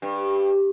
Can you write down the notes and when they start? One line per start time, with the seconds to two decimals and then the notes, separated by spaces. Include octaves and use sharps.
0.02 G2